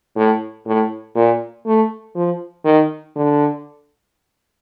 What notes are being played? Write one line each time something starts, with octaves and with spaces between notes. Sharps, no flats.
A2
A2
A#2
A3
F3
D#3
D3